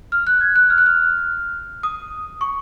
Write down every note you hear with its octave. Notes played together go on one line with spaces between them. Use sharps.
F6
F#6
G#6
F#6
F6
F#6
F6
D#6
C#6